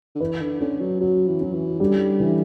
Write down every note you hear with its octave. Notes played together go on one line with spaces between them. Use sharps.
D3
E3 B4
D3
D3 C#4
F#3
F#3 F#4
E3
F#3 C#4
E3
D3 G3
E3